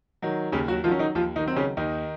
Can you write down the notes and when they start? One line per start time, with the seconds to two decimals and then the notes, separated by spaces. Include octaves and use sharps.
0.22 D#3 F#3
0.52 D#2 C#3 C#4
0.68 F#3 F#4
0.84 D#3 F3 F4
0.88 F#3 C#4
0.99 D#3 D#4
1.15 D#2 F3 F4
1.36 D#3 D#4
1.46 D#3 F#3 C4
1.56 C#3 C#4
1.77 D#2 D#3 D#4